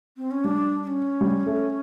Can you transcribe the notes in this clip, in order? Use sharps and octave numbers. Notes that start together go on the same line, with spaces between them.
C4
C#4
G3 D4
D4
C#4
G3
A3